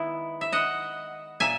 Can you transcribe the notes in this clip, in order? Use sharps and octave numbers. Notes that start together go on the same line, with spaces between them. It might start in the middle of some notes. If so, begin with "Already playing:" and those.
Already playing: D#3 G#3 B3 E4
E5
D#5 F#5
A#2 A#3 E5 G#5